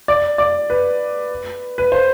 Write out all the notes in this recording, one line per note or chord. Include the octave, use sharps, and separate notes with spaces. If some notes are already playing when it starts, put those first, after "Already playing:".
D5
D5
B4
B4
C5